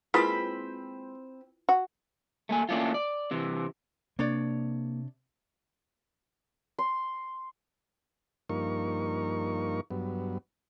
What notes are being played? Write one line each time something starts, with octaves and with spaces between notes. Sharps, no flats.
G#3 A#3 C4 E4 F4 B4 C5 B5
F#4
A3 A#3 G#5
A3 A#3 C#4 D4 E4 F4
D5
C3 E3
C3 A#3 D4 C#5 D5
C6
G2 F3 A#3 D#4 A#4 C#6
G2 F#3 B3